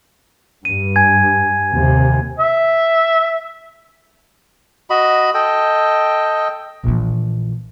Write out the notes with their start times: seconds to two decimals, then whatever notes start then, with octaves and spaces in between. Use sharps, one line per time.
0.65 G2 D#7
0.96 G#5 G#6
1.74 D#2 C3
2.39 E5
4.90 F#4 D#5 B5
5.34 A4 D#5 G5
6.84 A#1 E3